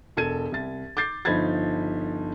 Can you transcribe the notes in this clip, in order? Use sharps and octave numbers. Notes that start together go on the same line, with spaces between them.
E1 A4 G#6 D#7
C2 A6
D6 G6 A6 C7
G1 F3 D#4 B5 G#6 A6